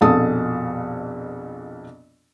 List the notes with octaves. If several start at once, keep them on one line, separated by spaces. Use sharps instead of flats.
A#1 F2 B2 A4 A5 D#6